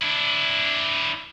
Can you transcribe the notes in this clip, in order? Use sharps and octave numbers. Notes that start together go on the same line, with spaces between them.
D4 E4